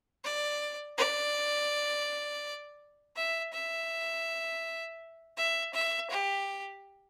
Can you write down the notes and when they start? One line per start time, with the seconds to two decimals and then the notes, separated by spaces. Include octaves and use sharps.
0.25 D5
0.97 D5
3.16 E5
3.53 E5
5.37 E5
5.74 E5
6.11 G4